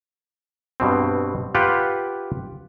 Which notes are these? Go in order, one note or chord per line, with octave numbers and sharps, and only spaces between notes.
G2 B2 C4
F4 G4 B4 F#5 G5